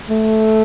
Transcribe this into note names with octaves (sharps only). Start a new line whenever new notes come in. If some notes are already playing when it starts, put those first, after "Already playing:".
A3